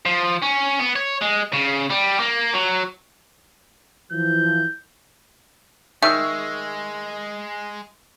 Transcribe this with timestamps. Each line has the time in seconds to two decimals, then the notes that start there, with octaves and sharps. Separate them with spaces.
0.06 F3
0.42 C#4
0.79 B3
0.96 C#5
1.22 G#3
1.54 C#3
1.91 G3
2.20 A#3
2.54 F#3
4.12 E3 F3 G6
6.03 D#3 G#3 E5 C#6 E6